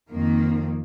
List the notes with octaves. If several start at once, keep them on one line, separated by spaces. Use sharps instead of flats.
F2 D#3 A#3